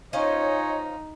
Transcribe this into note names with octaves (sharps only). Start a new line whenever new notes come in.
C#4 D#4 F4 C5 C#5 D#5